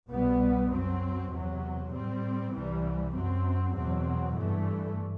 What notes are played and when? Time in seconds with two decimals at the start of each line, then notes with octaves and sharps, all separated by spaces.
0.09 C2 B2 G3 B3
0.70 F#2 F#3 C4
1.31 E2 C3 F#3
1.92 A2 G3 C4
2.53 C2 C3 E3 G3
3.13 F#2 F#3 C4
3.75 E2 B2 F#3 C4
4.36 G2 E3 A3